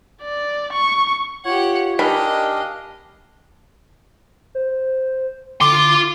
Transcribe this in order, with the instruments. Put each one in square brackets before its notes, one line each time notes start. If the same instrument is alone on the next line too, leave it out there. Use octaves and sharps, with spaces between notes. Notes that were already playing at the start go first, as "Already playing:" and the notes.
[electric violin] D5
C#6
[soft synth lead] F4 [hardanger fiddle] G4 F#5 [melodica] C#5
[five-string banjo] D#3 B5 [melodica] D4 F5 [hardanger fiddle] G4 D#5 [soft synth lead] G#5
[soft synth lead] C5
[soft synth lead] D3 [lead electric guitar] F4 C6 [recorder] D6